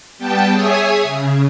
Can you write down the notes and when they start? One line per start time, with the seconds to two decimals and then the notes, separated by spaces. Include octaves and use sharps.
0.18 G3 B3 G5 A5
0.52 G#4 C#5 E5 G#5 D#6
1.02 C#3